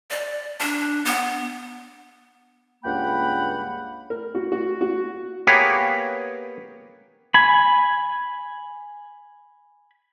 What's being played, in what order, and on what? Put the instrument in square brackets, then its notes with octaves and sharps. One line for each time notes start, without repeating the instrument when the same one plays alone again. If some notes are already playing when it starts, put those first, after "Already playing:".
[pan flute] D5
D4
B3
[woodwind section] C#2 G2 A#3 F#5 G5 B5
[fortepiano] A#4
F#4
F#4
F#4
[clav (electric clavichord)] A#3 B3 G4 G#4 B4 C#5
[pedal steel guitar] G#5 B5